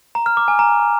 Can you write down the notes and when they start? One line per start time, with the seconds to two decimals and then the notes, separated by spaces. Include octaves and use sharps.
0.15 A#5
0.26 F6
0.37 D6
0.48 G#5
0.59 A#5